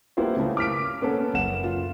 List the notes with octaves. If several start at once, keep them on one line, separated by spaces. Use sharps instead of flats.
A#3 B3 E4 F4 G4 C5
C#3 A3
D6 F6 B6 D7
A#3 B3 C#4 A4
F#1 F#5 E7
F4